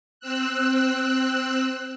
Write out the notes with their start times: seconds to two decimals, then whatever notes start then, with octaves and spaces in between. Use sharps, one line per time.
0.20 C4 E6 F#6